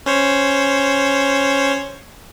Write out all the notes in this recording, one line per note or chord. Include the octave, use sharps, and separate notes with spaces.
C#4 C5 C#5